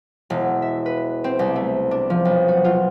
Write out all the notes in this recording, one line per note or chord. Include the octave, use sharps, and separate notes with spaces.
E1
E5
B4
C4
C2
A3
D4
F3
B1
F#4
F4